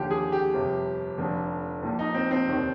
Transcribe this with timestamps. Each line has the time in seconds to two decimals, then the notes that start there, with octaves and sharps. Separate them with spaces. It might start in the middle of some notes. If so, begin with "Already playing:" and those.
Already playing: D#2 D3 F3 G4
0.11 G#4
0.32 G4
0.54 G1 F2 C3
1.18 F1 F2 D3 F3
1.82 A#1 A#2 F3
1.99 D#4
2.14 C4
2.31 C4
2.47 F1 D#2 D#3